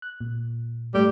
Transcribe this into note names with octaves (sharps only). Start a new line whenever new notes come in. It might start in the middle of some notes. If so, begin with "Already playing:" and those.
F#6
A#2
G#2 G3 A3